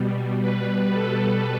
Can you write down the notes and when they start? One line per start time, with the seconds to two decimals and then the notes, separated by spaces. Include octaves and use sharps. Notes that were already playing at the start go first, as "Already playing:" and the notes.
Already playing: B2 G3
0.41 B4
0.93 A4